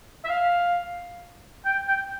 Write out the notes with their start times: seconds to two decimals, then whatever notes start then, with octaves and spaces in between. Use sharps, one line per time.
0.25 E5
0.29 F5
1.65 G5
1.88 G5